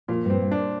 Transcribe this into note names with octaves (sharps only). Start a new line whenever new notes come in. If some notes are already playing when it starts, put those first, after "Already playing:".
A#2 F3
G2 C4
G2
D4